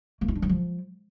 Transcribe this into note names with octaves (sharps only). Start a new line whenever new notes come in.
A#3
E4
D4
E3
F3